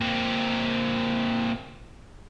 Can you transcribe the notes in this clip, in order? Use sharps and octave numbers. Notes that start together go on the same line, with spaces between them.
A#2 C4